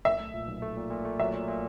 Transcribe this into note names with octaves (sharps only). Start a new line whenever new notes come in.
B1 E5
A3
A#2
B1
A3
A#2
A#2
A3
F#3 E5
A#2
A#2